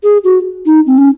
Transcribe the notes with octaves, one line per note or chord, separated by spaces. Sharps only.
G#4
F#4
D#4
C4
C#4